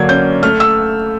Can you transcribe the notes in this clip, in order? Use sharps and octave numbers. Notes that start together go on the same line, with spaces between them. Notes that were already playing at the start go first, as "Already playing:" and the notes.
Already playing: D3 F#3 A#3 G#6
C#4 G6
A3 F6
E6